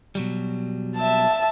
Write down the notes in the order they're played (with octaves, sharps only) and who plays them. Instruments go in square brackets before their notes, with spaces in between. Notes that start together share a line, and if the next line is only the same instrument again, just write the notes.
[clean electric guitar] B2 F#3 G3
[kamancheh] E5 A5